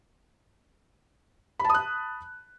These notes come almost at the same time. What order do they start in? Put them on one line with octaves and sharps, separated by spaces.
B5 A5 D#6 F#6